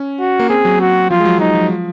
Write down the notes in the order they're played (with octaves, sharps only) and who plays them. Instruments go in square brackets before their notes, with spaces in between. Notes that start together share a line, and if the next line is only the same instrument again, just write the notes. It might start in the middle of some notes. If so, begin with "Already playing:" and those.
Already playing: [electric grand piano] C#4
[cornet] F#4
[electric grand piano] A#3
[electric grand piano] C4 [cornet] G#4
[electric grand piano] F#3
[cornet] F#4
[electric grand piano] F3 [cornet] F4
[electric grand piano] G#3
F#3
[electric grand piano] F3 [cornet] D#4
[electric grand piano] F3
F3